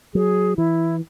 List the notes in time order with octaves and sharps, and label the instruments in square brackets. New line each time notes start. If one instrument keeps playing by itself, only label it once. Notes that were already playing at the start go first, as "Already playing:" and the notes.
[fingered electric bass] F#3 [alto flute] G#4
[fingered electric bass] E3 [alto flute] E4